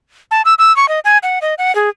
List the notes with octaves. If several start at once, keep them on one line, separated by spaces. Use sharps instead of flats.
A5
E6
E6
C#6
D#5
G#5
F#5
D#5
F#5
G#4